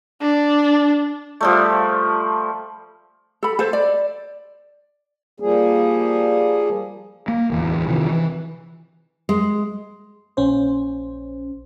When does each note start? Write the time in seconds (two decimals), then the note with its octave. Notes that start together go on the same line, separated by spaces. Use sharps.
0.22 D4
1.41 F3 G3 A3
3.43 A4 B5
3.59 A4 C5
3.73 D5
5.40 F3 G3 A#3 G#4
7.28 A#3
7.50 D1 E2
7.89 C3 D#3 F3 C4
8.11 E3
9.29 G#3
10.37 A#1 C#4 C5